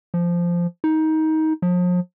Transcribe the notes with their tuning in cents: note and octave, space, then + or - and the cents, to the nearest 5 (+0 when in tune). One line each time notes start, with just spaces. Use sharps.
F3 -10
D#4 +20
F3 +40